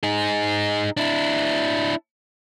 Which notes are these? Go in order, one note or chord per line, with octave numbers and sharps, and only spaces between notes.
D#4 G#4
D4 E4